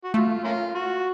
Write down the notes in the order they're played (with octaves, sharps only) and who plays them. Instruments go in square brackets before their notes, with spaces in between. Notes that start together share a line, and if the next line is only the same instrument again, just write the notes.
[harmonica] F#4
[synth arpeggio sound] A3 [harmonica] F4
[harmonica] A#3 C#4 F4
F#4